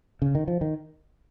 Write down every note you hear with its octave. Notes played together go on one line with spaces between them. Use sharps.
C#3
D#3
F3
D#3